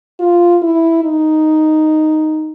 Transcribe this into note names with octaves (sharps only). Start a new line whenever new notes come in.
F4
E4
D#4